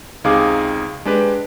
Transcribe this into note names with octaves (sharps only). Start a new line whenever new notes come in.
C#2 C3 D#4 G#4 F5 D6
G#3 D4 G4 B4